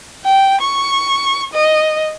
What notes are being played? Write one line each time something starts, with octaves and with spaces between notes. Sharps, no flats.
G5
C#6
D#5